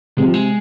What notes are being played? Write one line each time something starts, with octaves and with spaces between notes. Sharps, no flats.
C3 G#3
F3
G#3